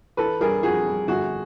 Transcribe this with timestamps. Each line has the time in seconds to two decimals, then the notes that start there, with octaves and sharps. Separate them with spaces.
0.17 E3 A4 B4
0.40 G3 G#4 A#4
0.63 F2 F#4 G#4
0.86 G3
1.08 G1 F#4 G#4